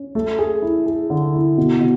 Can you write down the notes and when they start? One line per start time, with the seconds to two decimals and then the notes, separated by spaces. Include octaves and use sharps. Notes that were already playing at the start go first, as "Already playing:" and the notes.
Already playing: C#4
0.15 A3
0.39 G#4
0.62 E4
0.86 G#4
1.10 D3
1.34 E4
1.57 B2
1.81 B2